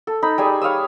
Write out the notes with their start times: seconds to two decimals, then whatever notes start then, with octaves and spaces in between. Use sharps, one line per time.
0.07 A4
0.23 D#4 B5
0.38 G3 G#4 G#5
0.61 C#5 F5 D#6 E6